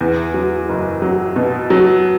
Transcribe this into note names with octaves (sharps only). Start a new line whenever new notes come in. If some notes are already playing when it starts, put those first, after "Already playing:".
E2
F#3
F#1
F#3
B2
F#3